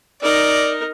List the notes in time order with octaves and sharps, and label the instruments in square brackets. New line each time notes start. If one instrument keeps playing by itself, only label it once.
[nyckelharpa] D#4 A#4 [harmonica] D5